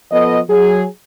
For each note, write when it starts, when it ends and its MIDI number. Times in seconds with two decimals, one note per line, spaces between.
0.11 0.39 53
0.11 0.39 59
0.11 0.39 69
0.11 0.39 75
0.49 0.85 54
0.49 0.85 68